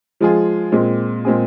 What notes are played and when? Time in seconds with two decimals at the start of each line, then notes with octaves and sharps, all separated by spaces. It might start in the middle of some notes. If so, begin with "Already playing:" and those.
0.20 F3 G#3 F4 G#4
0.72 A#2 G#3 C4
1.25 A#2 G#3 C4 G#4